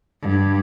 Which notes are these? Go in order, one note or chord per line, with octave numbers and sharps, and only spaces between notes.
G2